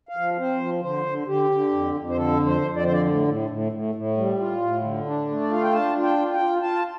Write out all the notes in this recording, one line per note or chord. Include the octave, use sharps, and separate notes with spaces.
F5
F3
C4 C5
F3
D3 C5
D3
D3 G4
D3
F2
F2
C5
D3 A4
F2
C5
F2
D5
D3 C5
D5
A2
A2
A2
A2
A2
G3
F4
A2
D3
D4
A3
D5
F4 F5
G5
D4 A5
F4
G5
F4
G5
F4
F4 A5